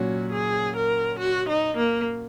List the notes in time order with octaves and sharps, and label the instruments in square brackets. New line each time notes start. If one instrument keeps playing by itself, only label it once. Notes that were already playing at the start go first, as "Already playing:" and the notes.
Already playing: [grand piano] A#2 F#3 C#4 [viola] F#4
[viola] G#4
A#4
F#4
D#4
A#3